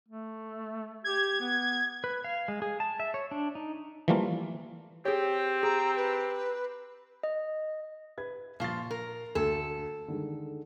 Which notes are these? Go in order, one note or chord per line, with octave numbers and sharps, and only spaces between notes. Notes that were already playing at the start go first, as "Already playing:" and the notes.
A3
G4 G#6
B3
B4
F5
G#3
G#4
A5
E5
C#5
D4
D#4
E3 F3 G3 A3 A#3 F4
C4 G4 G#4 C#5
G#4 A#5
B4
D#5
B4 G#6
A#2 F3 F4 C#6 A6
A#4
D2 A4 G#6
D3 D#3 G#3